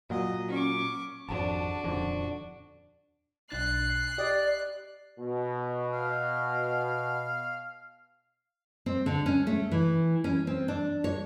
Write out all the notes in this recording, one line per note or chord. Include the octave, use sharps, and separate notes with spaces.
A#2 F#3 D#5
C#4 C#6 D6
G#1 F2 D4 F#4 A5
D#1 F2 D3
B1 D4 F#6 A6 C7
G4 D5 D#5
B2
F5
C4
D3
C#4
A3
E3
C#4
C4
D4
C#5